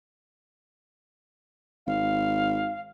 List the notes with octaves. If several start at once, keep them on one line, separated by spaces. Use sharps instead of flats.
G#1 F5